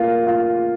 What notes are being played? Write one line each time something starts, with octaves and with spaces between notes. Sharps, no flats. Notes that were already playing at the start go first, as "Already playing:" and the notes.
Already playing: A#3 F4
F4